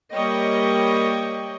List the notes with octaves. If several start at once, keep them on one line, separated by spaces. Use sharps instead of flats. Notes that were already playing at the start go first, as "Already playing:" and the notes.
G3 A#3 C#5 D#5 G5